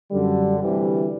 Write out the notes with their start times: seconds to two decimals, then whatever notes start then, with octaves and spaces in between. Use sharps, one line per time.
0.11 F#2 D3 G3
0.60 D2 C3 E3 G3